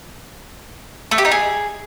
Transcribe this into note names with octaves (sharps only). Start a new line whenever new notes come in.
A3
G4
D#4
G#4